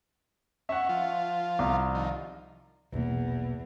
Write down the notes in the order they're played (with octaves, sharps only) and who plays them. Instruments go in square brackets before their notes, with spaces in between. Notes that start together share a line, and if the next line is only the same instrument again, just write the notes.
[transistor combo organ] C#4 [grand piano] E5 F#5
[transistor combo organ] F3 F4
[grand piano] C2
[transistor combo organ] D#3 F3
[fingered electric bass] A#1 B2 A#3 [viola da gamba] E2